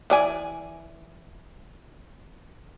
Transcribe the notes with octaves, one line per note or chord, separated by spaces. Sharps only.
E3 D5 G#5